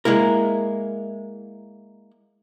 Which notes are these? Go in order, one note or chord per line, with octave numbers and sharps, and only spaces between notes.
G#3 A#3 E4 A#4